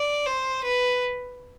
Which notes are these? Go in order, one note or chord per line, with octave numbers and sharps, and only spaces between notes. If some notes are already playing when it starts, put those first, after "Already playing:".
Already playing: D5
C5
B4